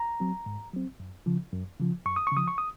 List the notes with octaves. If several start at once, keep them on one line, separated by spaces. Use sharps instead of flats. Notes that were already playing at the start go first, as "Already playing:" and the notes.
Already playing: A#5
F#3 C4
G#2
F#3 C4
F#2
C#3 F3
F#2
C#3 F3
F#2 C#6
D#6
C#6
C#3 F3 D#6
C#6
D#6